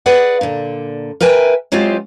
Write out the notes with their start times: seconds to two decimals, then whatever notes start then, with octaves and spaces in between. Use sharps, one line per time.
0.06 G#4 B4 D5 F#5
0.41 A#2 D3
1.21 A#4 B4 E5 G5 G#5
1.72 F#3 G#3 C4 E4 F4 G4